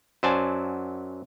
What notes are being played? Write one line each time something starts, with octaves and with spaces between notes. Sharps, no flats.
F#2 F#3 C5 D5 G#5 A5